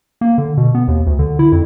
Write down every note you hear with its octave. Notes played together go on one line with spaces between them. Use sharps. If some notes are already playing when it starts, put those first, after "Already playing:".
A#3
D3
B2
B3
D#2
D2
D3
E4
F2